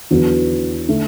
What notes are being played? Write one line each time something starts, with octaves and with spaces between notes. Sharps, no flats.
E2 D3 F#3 B3 F#4
D3 A3